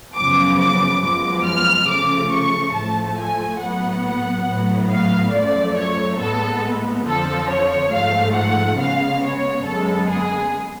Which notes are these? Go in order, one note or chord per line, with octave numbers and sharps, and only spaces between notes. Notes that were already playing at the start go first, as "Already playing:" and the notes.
F#2 C#3 F3 B3 D6
D6
F#2 F3 G#3 B3 D6
F6
C#3 F3 A3 D6
C#6
A2 F3 A3 A5
G#5
A2 F#3 B3 F#5
A2 F#3 B3
F5
F#2 F3 A3 D5
C#5
A2 G#3 B3 A4
F2 D3 F3 A4
C#5
G#2 F3 A3 F5
F#5
C#3 G#3 B3 F5
C#5
F#2 D3 G#3 B3 A4
G#4